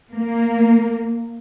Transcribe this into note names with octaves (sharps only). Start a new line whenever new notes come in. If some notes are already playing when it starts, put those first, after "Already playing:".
A#3